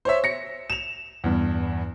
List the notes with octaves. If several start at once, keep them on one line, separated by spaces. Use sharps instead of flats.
C5 C#5 E5
A#6 C#7
E7 F7
E2 G2